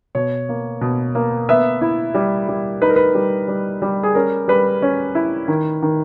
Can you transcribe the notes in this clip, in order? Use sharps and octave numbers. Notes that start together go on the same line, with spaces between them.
B2 C#5
A#3
B2
A#3
B3 E5
E4
G3
G3
D#4 B4
A#4
B4
G3
G3
G3
G#4
C#4 A#4
G3 B4
C#4
E4
D#3
D#3